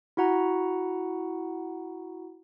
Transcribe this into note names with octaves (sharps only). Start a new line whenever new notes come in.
E4 F#4 F#5 A#5